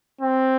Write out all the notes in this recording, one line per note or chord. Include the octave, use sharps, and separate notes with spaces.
C4